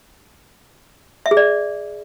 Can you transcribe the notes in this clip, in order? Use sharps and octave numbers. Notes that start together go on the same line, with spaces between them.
E5
G#4
D5